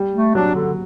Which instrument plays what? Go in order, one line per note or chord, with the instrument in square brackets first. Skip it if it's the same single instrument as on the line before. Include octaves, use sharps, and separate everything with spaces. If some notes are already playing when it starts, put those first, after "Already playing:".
Already playing: [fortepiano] G3
[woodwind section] A3
[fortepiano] F#3 [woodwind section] D4
[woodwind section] D3